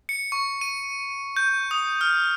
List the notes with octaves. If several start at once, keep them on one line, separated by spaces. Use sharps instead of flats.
C#7
C#6
D#7
G6
D#6
F6